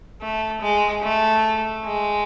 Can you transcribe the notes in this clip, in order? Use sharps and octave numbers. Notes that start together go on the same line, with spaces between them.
A3
G#3
A3
G#3